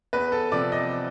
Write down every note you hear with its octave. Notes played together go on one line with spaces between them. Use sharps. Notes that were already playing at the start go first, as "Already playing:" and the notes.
E2 B4
A4
C3 F3 D5
D#5